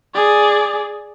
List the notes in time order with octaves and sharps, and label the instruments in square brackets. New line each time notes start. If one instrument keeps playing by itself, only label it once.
[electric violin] G#4 D5